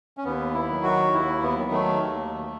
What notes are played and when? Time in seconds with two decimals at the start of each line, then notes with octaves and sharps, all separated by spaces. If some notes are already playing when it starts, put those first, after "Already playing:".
0.17 C#4
0.24 D#2 B3
0.54 E4
0.69 D#3 F#3
0.83 F#4
1.13 D#2 E4
1.42 B3
1.57 D#3 F#3
1.71 A3
2.01 D#2